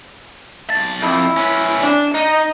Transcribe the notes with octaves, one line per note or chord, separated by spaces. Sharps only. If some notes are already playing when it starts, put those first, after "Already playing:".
B1 A5
F2 E4
C#4 B4
D4
D#4 D#5